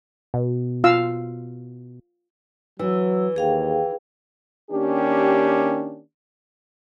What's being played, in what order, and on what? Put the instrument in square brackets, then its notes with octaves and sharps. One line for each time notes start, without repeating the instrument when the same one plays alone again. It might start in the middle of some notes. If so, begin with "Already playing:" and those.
[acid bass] B2
[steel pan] F4 F5 E6
[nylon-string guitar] E3 [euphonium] F#3 [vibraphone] E6
[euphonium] D#2 [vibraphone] G#4 F5 G5
[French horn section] D#3 A#3 C#4 D4 G4